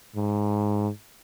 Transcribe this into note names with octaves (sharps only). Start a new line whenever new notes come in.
G#2